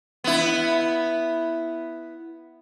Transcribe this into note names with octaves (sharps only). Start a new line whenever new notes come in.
B3 E4